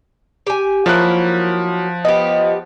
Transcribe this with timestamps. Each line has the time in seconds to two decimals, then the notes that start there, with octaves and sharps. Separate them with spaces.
0.47 G4 G#5
0.86 F3 F#3 A#3 E4 F#6
2.05 B3 G4 D#5